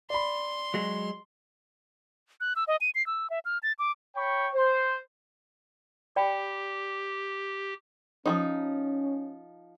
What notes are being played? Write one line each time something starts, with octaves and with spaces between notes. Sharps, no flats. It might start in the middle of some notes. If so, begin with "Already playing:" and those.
D5 B5 C6
F#3 G#3
F#6
E6
D#5
D#7
C7
E6
E5
F6
A6
D6
C#5 G5 B5 C#6
C5
G4 D5 G5 B5
F3 F#3 C#4 D#4